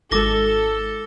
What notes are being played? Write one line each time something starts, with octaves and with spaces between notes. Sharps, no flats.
G#1 G#3 A4 D6 A#6 G7